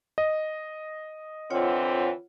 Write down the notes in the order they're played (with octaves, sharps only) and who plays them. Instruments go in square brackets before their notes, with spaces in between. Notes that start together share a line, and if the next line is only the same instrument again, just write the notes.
[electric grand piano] D#5
[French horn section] D3 E3 C4 [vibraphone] F4 C#5 F#5